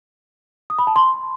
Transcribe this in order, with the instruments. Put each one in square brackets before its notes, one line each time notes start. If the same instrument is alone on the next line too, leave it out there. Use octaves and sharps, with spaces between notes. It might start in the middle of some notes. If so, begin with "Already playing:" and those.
[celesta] D#6
B5
A5
C6